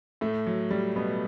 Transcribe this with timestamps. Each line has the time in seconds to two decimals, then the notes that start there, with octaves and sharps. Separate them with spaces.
0.21 A2 A3
0.47 F#3
0.71 G3
0.96 B2 B3